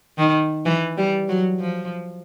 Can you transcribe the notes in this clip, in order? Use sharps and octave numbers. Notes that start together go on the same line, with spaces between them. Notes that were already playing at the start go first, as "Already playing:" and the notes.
D#3
E3
G3
F#3
F3